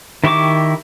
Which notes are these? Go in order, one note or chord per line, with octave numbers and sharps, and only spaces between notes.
D#3 E4 G4 C#6 D6